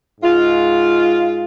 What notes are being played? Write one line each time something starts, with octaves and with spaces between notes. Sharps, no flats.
G#2 G#3 F4